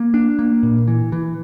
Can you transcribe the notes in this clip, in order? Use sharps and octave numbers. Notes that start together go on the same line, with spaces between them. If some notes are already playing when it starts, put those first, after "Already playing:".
Already playing: A#3
D4
A#3
A#2
E3
E3